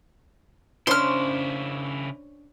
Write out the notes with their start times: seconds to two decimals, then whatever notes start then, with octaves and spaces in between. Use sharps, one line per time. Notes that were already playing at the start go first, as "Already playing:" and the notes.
0.87 C#3 C#4 D4 E4 C5 C6 F6